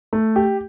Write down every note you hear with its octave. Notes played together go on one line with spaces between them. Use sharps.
A3
G4